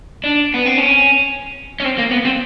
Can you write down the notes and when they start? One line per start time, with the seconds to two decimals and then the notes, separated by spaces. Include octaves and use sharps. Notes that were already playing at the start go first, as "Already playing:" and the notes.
0.24 D4
0.54 B3
0.66 C4
0.78 C#4
1.80 C#4
1.85 C4
1.98 A#3
2.11 B3
2.25 C4